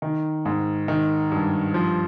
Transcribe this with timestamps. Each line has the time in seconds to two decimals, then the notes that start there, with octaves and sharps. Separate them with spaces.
0.02 D#3
0.45 G#2
0.88 D#3
1.31 G2
1.74 F3